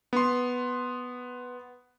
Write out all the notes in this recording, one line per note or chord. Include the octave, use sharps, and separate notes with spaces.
B3 C6